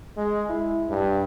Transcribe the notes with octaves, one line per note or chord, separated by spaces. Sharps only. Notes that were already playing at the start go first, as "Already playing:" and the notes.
G#3
E4
G2